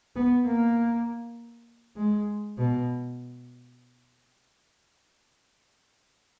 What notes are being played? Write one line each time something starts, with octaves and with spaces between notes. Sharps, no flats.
B3
A#3
G#3
B2